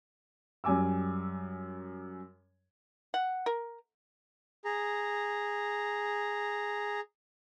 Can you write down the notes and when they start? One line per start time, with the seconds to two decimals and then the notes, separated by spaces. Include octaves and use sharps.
0.64 F#2 G3 G#5 D6 E6
3.14 F#5
3.46 A#4
4.65 G#4 A#5